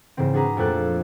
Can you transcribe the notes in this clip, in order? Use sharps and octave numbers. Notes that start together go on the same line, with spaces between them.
G#2 C#3 E3 C4
D4 F#4 G#4 B4 A#5
F2 A#2 A3 D5 F#6 A6